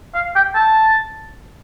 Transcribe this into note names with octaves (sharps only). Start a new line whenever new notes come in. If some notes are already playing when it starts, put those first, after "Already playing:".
F5
G5
A5